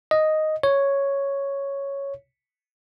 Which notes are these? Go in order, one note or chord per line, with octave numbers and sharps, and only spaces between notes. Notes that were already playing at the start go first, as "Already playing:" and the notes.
D#5
C#5